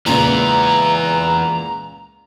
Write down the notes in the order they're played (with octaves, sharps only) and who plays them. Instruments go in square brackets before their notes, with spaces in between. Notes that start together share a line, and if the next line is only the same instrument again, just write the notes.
[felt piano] C#2 A#2 [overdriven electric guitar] E3 B3 [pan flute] A#5